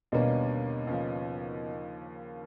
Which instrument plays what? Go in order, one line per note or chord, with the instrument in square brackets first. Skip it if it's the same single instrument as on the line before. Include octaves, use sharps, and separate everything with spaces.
[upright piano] D#2 D3 G3 A#3 C#4 [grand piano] B2
[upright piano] D#2 C#3 F3